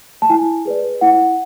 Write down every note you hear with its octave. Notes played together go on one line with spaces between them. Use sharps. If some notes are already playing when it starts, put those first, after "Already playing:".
A5
E4 G#5
G#4 B4 D5
E4 F#5